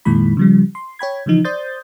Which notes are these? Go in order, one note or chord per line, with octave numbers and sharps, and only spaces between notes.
F2 A#2 D#3 G#3 E4 B5
C#3 F3 G3
C6
C#5 G5 B5 G#6
C#3 E3 F3 D#4
C5 D5 C6 D#6 G6 A6